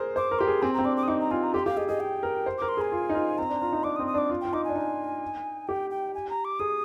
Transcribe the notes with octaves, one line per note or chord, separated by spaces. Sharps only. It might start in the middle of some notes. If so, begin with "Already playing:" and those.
Already playing: G#4 A#4 C5
C5 D6
A#4
G4 C6
G#4
C4 G#5
C4 A#5
D4 D6
D6
D#6
D#4 D6
A#5
F4 G#5
A#5
G4 C6
G4 F5
G#4 D#5
G#4 D#5
G5
A#4
C5
A#4 D6
C6
G#4 G#5
F4
D#4
F4
C4 A#5
D4
F4
D#4
D4 D6
D#6
C4
D#6
D4 D6
F4
F4 G5
D#4 D6
D4 G#5
D#4
G4 G5
G5
G#5
A#5
D6
G#4 D#6